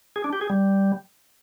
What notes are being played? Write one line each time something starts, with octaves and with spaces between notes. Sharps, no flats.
G#4
D4
G4
G#4
G3